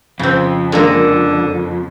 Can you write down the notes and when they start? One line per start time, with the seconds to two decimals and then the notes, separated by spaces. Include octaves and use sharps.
0.20 F2 C#3 C4
0.72 D3 G#3 A#3 A#4